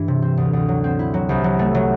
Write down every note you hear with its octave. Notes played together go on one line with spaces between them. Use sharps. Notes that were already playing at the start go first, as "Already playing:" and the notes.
Already playing: G2 E3
C3
C4
D2
D2
F#3
C4
E4
F#3
C2
F#3
A3
F#3